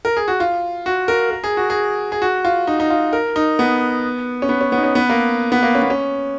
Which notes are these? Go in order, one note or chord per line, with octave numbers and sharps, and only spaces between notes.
A#4
G#4
F#4
F4
F#4
A#4
A#4
G#4
F#4
G#4
G#4
F#4
F4
D#4
D#4
F4
A#4
D#4
B3
C#4
B3
C#4
B3
D#4
C#4
B3
A#3
B3
A#3
C#4
B3
C#4